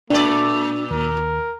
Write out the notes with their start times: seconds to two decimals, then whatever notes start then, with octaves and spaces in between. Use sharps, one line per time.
0.10 A#2 A3 D4 D5
0.91 D#2 A#4